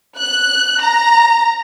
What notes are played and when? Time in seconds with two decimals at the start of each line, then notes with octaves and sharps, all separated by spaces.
0.18 F#6
0.81 A#5